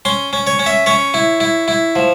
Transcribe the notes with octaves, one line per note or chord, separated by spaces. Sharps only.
C#4 C6
C#4
C#5
C#4
E5
C#4 C#5
E4
E4
E4
F3